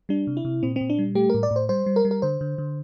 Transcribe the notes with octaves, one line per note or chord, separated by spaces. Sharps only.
G3 D4
C3
E4
C3
A#2 C4
A#2 C4
D4
G3
A3 G4
A2 A#4
D5
A2
C5
G3 C5
G3
A#4
G3
A#4
D3 C5
D3
D3